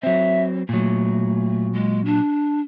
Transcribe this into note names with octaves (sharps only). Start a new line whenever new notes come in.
F#3 C4 E5
A#2 F#3 A3
G#3
D4